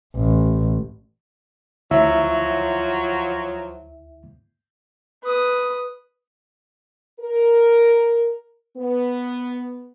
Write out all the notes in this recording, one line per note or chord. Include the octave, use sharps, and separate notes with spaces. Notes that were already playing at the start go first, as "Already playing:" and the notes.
A1
D2 F3 F#3 E4 E5
B4 D#6
A#4
B3